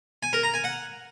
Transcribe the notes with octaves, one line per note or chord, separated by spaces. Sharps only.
G#5
A#4
A#5
G#5
F#5